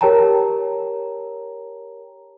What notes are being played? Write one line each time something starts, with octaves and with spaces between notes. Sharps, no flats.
G4 A#4 C#5 G5 A5 A#5